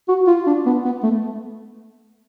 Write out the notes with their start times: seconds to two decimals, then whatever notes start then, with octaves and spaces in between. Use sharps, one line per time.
0.08 F#4
0.27 F4
0.46 D4
0.66 B3
0.84 B3
1.03 A3